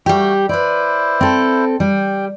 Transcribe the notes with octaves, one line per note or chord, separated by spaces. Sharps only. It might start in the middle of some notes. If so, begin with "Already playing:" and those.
G3 A3 F#4 G4
E4 B4 C5 D5
C4 A4
G3 G5